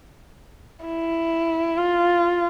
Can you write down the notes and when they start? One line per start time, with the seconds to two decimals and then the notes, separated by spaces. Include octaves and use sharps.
0.85 E4
1.77 F4